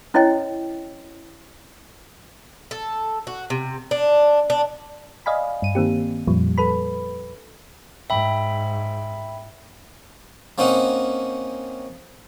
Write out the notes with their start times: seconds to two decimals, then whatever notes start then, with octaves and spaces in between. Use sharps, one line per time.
0.14 C#4 E4 C#5 D#5 G5
2.71 A4
3.27 F#4
3.50 C3
3.91 D4
4.50 D4
5.26 D5 D#5 F5 G#5 B5
5.62 G2 D#7
5.75 D#3 A#3 C4 G4
6.27 F2 A#2 F3 G3
6.58 A4 B4 B5
8.10 G#2 E5 G5 B5
10.58 A#3 C4 C#4 D#4 F#5